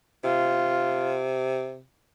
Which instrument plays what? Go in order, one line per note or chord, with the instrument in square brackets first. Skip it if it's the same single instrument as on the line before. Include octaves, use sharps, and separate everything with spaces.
[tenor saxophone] C3 [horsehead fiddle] F4